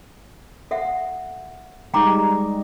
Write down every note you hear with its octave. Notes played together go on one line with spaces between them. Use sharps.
A4 E5 F#5
G3 G#3 D#4 G5 A#5 D6